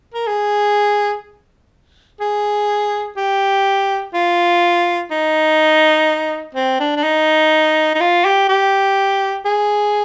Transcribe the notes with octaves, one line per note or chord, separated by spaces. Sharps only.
A#4
G#4
G#4
G4
F4
D#4
C4
D4
D4
D#4
D#4
F4
G4
G4
G#4